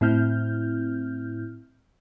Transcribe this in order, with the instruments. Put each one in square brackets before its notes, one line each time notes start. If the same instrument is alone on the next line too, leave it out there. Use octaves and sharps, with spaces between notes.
[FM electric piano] A2 C4 E4 F6 G6